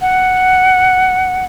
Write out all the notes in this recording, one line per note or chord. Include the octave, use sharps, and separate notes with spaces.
F#5